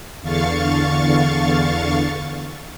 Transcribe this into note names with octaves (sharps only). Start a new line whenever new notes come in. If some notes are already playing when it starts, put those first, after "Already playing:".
E2 D3 F5 C#6 A6